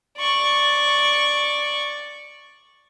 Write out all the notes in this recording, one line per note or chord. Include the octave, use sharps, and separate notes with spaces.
D5 C#6